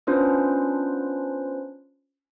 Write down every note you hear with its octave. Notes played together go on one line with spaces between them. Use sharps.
B3 C#4 D4 F4 B4 C5